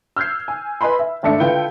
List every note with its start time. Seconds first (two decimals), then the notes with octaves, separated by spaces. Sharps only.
0.17 E6 F6 G6 G#6 C7
0.48 G#5
0.81 B4 D#5 G#5 B5 C6
0.99 E5
1.23 G#1 A3 D4 E5 C#7
1.40 D3 E4 F4 B4 G5